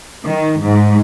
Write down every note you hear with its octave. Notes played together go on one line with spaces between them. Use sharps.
D#3
G#2